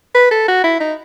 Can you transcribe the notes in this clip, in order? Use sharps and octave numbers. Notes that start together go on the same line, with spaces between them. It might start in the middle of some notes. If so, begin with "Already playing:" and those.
B4
A4
F#4
E4
D#4